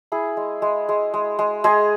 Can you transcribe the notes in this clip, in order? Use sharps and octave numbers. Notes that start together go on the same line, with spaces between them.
E4 G#4
G#3
G#3
G#3
G#3
G#3
G#3 G#4